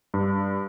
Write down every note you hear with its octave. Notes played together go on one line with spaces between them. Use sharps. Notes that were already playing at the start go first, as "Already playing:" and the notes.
G2